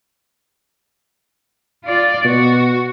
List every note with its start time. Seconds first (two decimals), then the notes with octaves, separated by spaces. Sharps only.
1.85 F4 D5
2.25 B2 F#4